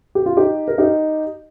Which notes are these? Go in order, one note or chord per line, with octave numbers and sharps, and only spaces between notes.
G4
F4
D#4 G4
A#4
D#4 G4